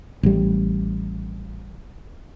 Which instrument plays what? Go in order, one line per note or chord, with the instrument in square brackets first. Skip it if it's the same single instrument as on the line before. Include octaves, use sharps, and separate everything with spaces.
[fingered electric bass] A1 G3